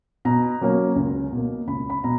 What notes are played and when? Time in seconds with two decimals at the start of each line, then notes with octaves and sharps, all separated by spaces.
0.25 B2 A#5
0.61 F#3 A#3 C#4
0.96 C#2
1.32 B2 A#3
1.67 C#2 B5
1.90 B5
2.04 B2 A#5